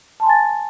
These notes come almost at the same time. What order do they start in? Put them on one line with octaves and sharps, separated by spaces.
A5 C6 G#5 A6